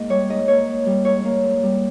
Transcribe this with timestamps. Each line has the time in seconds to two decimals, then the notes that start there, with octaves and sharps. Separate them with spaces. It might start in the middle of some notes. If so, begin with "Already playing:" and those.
Already playing: G#2 A#3 D#5
0.10 G3 C#5
0.29 G#2 D#5
0.48 A#3 C#5
0.67 G#2
0.86 G3
1.05 G#2 C#5
1.24 A#3
1.43 G#2
1.63 G3